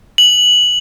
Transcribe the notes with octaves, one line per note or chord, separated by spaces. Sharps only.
F#7